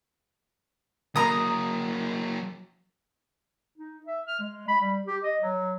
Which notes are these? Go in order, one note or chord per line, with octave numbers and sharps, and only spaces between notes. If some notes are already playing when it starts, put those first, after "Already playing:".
F#3 A#3 A#5 D#6
D#4
E5
F6
G#3
B5
G3
G4
D#5
F#3